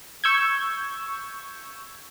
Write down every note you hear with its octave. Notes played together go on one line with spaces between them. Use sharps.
C#6 E6 G6 G#6